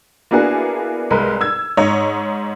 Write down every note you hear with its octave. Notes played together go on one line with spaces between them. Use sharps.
A#3 B3 D4 E4 F#4 G#4
C2 G#3 A#4 B4
E6 G#6
G#2 C#5 D#5